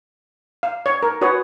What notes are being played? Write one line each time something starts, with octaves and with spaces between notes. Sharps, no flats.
F5
C#5
A#4
F#4 B4 C#5 D#6